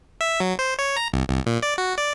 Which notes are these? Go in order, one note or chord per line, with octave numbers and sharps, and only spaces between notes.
E5
F#3
C5
C#5
A#5
C2
C2
A#2
D5
F#4
D5